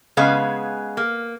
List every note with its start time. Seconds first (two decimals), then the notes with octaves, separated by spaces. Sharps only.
0.17 C#3 G#3 B3 G#4 B4 F5
0.97 A#3